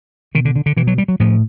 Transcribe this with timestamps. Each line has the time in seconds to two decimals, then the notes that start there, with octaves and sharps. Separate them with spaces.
0.35 B2 D#3
0.45 D3
0.56 D3
0.66 D3
0.77 B2 E3
0.87 F#3
0.98 G3
1.08 F#3
1.20 A2 F3